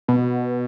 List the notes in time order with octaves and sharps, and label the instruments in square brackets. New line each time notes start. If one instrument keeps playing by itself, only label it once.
[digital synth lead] B2